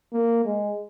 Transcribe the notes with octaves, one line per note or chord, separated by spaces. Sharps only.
A#3
G#3